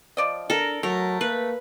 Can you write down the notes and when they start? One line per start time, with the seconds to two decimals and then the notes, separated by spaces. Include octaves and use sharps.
0.17 F3 D5 D#5
0.50 D4 A4 A#4
0.83 F#3 A3 A#4
1.21 A#3 B4